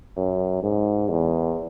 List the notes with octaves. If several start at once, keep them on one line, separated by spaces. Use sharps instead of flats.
F#2
G#2
E2